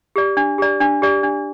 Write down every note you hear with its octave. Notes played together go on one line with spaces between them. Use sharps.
G4 D5
D4
G4 D5
D4
G4 D5
D4